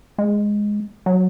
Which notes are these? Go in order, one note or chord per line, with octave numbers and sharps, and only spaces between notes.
G#3
F#3